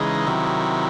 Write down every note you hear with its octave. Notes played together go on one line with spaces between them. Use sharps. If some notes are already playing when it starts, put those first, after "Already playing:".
Already playing: C#3 E3 G#3 D#4
C3 D#3 F#3 E4